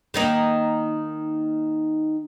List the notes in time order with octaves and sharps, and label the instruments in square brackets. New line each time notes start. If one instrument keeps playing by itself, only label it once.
[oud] D#3 A#3 D#4